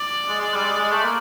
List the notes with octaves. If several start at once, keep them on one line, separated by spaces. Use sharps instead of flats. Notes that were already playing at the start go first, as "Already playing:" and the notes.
Already playing: D5
G#3
G#3
G3
G#3
G#3
A3
A#3